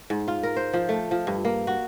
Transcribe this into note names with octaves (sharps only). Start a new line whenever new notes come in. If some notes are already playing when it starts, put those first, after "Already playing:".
G#2
F4
A#4
C5
F3
A3
F3
G2
A#3
F#4